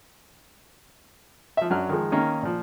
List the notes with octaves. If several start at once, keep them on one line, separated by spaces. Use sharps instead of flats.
F3 E5
F#2 F#3 D4 F6
D#3 F3 G#3
D#3 A#3 C#4 D#4
A#2 F3